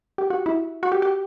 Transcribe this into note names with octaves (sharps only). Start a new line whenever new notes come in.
G4
F#4
E4
F#4
G4
G4